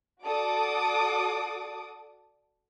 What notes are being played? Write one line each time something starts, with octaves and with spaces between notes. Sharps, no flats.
F#4 A4 D5 D6 D#6